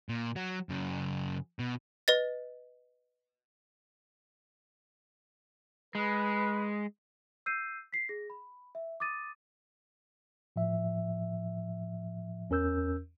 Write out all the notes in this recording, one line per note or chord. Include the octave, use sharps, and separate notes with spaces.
A#2
F#3
F#2 C#3
B2
B4 D#5 A6
G#3 B4
E6 G6 C7 D#7
B6 C7
G#4 A#6
B5
E5
D6 D#6 A6 D#7
A2 F3 E5
E2 C#4 A#4 E6 G6